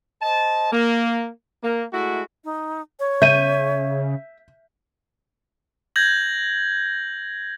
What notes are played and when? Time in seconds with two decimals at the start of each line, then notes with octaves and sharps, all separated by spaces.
0.22 C5 D#5 A5
0.72 A#3
1.64 A#3
1.93 G#3 A3 E4 F#4
2.44 D#4
3.00 C#5
3.22 C#3 E5 G6 D#7
5.96 G6 G#6 A#6 F#7